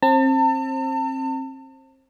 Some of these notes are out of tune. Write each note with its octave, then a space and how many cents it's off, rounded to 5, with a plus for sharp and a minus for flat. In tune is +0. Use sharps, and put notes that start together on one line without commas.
C4 +30 A5 +40